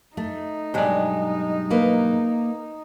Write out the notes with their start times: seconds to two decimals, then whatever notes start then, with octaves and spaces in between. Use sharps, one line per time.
0.17 A3 D#4
0.74 B1 G2 G#3 D5
1.70 A#3 B4 D#5